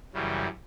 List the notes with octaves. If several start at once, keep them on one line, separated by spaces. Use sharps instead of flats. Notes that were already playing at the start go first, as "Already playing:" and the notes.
F#2 C#3 E3 G3